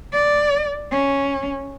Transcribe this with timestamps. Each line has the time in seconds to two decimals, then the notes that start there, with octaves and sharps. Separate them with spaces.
0.13 D5
0.92 C#4